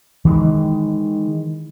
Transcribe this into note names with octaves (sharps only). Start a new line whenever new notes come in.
D#3 E3 G#3